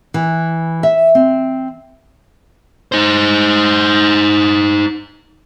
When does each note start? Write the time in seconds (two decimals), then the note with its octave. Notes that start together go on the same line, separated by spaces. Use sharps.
0.14 E3
0.83 E5
1.15 C4
2.92 D#4 C5